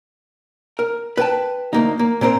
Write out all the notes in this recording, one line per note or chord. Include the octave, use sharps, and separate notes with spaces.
A#4
B4 G5 A5
D2 A#3 D#4
A#3
A#2 C4 A#4 C5